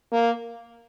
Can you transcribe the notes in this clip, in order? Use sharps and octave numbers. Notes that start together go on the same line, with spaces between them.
A#3